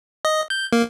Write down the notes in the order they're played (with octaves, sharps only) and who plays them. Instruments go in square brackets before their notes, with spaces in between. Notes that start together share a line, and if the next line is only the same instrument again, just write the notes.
[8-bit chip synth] D#5
G6
A#3